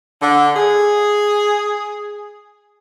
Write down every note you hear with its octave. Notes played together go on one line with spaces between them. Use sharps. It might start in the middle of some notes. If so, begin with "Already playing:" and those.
D3
G#4